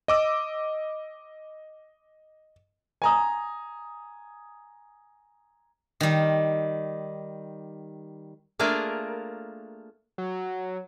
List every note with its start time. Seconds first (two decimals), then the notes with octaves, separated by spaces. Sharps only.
0.08 D#5 D6 E6
3.02 G#5 A#5 D#6
6.00 D#3 G3
8.59 A3 A#3 D4 F4 G#4 A#4
10.18 F#3